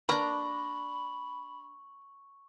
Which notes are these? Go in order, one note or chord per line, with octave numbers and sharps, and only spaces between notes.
A#3 D4 B4 D5 A#5 B5 C#6